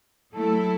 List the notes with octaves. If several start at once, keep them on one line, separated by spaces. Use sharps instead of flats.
F#3 A3 E4 A4